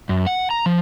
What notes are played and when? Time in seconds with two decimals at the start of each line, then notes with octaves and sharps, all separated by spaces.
0.09 F#2
0.27 F#5
0.51 A#5
0.66 F3